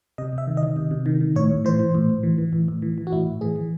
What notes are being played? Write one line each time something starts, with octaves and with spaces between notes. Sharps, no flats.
C3 D#5
C3 E5
D#3
D#5
D#3
C3
C3
D#3
D#3
A2 C#5
A2
E3 C5
E3
A2
A2
E3
E3
A2
A2
E3
E3
F#4
A2 E4
A2
E3 G#4
E3